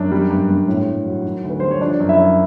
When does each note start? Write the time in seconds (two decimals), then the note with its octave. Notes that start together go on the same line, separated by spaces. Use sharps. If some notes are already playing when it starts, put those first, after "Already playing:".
Already playing: F#2 D4
0.12 G3
0.30 G2
0.50 G2
0.68 A2
0.87 A2
1.06 F#3
1.25 D#3
1.43 D2
1.50 B4
1.60 G3 C5
1.71 C#5
1.81 F3 D4 D5
2.00 F#2
2.09 E4 E5
2.19 F#2